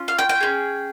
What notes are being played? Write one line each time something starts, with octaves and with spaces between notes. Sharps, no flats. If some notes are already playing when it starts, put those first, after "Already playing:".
Already playing: C#4 F4
F5
G5
G5
C#4 F4 G#4